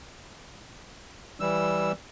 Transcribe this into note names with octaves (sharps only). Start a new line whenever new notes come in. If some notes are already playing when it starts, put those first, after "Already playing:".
E3 G3 E6